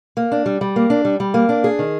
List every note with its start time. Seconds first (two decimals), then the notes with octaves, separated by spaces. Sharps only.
0.17 A#3
0.32 D4
0.46 G3
0.61 G3
0.76 A#3
0.90 D4
1.05 G3
1.20 G3
1.34 A#3
1.49 D4
1.64 G#4
1.79 D#3